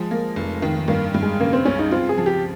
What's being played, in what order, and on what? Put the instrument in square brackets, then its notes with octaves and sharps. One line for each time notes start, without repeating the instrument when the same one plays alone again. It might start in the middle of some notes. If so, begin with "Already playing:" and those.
Already playing: [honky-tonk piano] F3 [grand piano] G#3
[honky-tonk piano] A#3
F1
D#3
[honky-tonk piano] G2 [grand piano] A#3
[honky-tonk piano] G2
[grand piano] G#3
[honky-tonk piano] C#3 [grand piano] A#3
[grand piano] C4
[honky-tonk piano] C#2 [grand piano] C#4
[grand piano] D#4
[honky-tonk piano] C4 [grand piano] F4
[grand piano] G#4
[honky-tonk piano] F3
[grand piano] G4